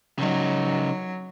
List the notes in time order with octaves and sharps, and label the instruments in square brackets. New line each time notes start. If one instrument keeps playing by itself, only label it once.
[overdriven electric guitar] C#3 D#4 [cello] F#3